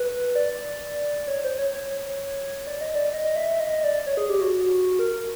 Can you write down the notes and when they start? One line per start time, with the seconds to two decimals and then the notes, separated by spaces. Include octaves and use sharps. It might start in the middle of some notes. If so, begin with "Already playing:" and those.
Already playing: B4
0.35 D5
1.28 C#5
1.44 C5
1.59 C#5
1.74 C#5
2.67 D5
2.81 D#5
2.95 D5
3.13 D#5
3.36 E5
3.60 D#5
3.83 D5
4.07 C#5
4.17 G#4
4.29 G4
4.41 F#4
4.99 A#4